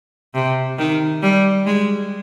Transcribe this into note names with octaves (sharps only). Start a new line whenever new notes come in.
C3
D#3
G3
G#3